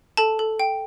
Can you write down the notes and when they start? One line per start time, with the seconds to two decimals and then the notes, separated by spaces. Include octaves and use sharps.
0.17 A4 A5
0.39 A4
0.60 G5